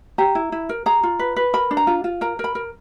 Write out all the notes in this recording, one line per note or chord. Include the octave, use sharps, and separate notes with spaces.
G4 A#5
E4
E4
A#4
G#4 A#5
F4
B4
B4
A#4 B5
D4
A#5
F4
F4
A#4 A#5
A#4 B5
A#4